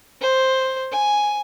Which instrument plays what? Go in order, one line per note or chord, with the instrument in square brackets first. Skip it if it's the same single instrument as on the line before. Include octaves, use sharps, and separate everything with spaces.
[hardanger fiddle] C5
G#5